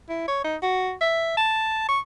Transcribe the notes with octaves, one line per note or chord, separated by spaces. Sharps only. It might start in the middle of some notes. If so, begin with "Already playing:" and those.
E4
C#5
D#4
F#4
E5
A5
C#6